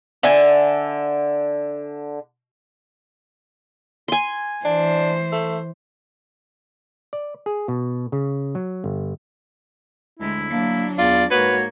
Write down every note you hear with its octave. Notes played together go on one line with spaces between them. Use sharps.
D3 E5 G#5
G#5 C6
E3 D4 C5
A3
D5
G#4
B2
C#3
F#3
G1
D2 G#3 E4
F#3 A#3 D4
E2 F4 D5
G#2 A#3 F#4 B4 C#5